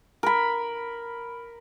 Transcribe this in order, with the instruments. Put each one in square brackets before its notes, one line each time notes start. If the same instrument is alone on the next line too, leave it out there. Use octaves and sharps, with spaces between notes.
[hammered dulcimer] A#4 B5